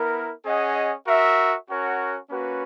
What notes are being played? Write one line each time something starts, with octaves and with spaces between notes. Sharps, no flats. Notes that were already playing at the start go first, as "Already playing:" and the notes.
Already playing: B3 E4 A#4
C#4 G#4 D#5 F#5
F#4 A#4 E5
C#4 F#4 A#4 C#5 F#5
A#3 C#4 F#4 B4